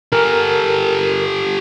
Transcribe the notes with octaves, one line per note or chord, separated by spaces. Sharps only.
G4 A4 A#4